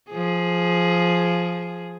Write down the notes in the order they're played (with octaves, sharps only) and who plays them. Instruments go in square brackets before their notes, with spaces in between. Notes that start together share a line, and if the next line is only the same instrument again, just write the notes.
[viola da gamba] F3 G#4